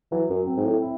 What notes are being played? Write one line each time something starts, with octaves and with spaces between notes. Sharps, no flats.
E3 F#3
F#2
C4
G#2
A2
E4